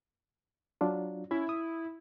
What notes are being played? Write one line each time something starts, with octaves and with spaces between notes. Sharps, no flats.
F#3 D4 F4
C#4 E4 B5 G#6
D#6